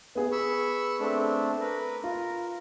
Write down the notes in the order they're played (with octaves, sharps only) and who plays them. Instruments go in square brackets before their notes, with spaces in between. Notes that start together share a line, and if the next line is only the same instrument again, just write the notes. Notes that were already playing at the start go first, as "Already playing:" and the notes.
[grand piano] B3 G#4
[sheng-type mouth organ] B5 C#6 E6
A3 C4 D4
A#4 B4
[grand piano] F4 [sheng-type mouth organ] A#4